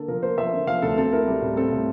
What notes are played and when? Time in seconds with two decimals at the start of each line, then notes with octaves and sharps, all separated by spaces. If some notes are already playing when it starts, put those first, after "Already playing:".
Already playing: D3 A#3 A4
0.08 F3 A#4
0.22 A#3 C5
0.38 F3 E5
0.52 D3
0.67 F3 F5
0.82 D2 A4
0.97 C4 A4
1.13 E4 A#4
1.27 G3
1.42 A2
1.57 C4 A4
1.72 A2